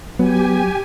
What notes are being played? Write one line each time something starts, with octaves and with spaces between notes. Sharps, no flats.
F#3 B3 G4 G#5